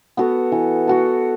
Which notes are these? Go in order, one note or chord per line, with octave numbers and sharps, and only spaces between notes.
B3 F#4 A4
E3
B3 F#4 A4